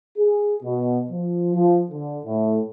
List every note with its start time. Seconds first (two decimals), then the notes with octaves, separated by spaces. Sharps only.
0.18 G#4
0.63 B2
1.11 F3
1.55 F3
1.91 D3
2.26 A2